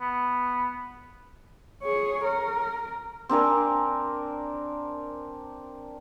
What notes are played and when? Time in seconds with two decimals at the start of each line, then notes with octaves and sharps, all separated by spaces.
0.01 B3
1.83 G#4 C#5
2.24 A#4
3.29 C4 D4 A#4 G#5